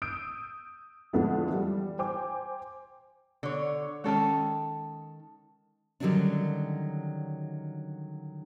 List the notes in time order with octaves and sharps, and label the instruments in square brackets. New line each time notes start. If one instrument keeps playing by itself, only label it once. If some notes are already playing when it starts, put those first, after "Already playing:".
[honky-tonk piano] D#6 E6 G6 D7
F2 D3 G#3 A3 B3 E4
E3 G3
C5 G5 G#5 D6
[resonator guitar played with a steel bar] D3 C#5
[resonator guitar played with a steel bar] D#3 A4 C#5 [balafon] G#3 C#4 A5
[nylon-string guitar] D3 D#3 F#3 G3 C#4 D4